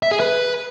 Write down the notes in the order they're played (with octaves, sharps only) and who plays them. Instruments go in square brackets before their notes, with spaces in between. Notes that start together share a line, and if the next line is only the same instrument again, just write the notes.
[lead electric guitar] E5
G#4
B4